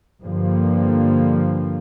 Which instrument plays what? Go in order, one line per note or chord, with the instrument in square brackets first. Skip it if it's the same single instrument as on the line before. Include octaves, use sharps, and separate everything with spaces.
[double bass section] G2 D3 F3 A#3